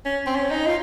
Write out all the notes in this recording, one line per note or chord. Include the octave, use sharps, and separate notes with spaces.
C#4
C4
C#4
D#4
F4